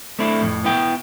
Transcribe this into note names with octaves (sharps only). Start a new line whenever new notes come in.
A3 C4 D4 E4
F2 A2
B3 E4 G5